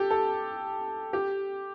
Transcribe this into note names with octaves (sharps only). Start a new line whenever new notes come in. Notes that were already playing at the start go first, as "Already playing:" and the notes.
Already playing: G4 A4
A4
G4